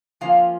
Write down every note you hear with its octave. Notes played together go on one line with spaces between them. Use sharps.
F3 A#3 C#4 F4 F5